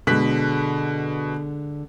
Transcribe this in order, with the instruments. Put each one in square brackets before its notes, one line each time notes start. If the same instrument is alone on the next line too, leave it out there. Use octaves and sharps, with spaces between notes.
[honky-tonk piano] B2 F#6 B6 [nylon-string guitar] D3 G#3